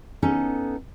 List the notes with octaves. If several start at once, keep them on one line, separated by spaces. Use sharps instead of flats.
B3 C#4 D#4 A4